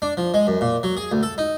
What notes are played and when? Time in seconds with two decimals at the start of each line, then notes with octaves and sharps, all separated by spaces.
0.02 D4
0.17 F3
0.34 G#3
0.47 F#2
0.61 A#2
0.83 F#3
0.97 G#4
1.12 D2
1.23 A4
1.38 D#4